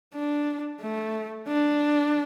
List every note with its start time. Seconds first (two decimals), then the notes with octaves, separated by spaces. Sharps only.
0.14 D4
0.81 A3
1.48 D4